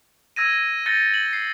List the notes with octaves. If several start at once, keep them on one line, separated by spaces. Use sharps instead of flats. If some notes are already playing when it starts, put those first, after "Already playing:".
E6 G#6 A#6 D#7
G6 A6 A#6 C#7 D#7 G7
F#7
C7